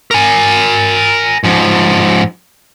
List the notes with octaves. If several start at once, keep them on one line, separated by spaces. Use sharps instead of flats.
A#4 G#5
G#2 F3